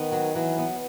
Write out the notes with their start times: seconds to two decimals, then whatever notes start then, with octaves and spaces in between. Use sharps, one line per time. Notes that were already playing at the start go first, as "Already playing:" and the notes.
Already playing: D#3 B3
0.12 F#3
0.35 E3 F#3
0.58 B3